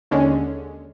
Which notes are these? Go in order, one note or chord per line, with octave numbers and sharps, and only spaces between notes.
D#2 D3 G#3 C#4